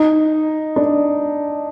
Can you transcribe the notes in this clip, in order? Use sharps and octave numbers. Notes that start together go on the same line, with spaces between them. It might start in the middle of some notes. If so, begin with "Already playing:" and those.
Already playing: D#4
D4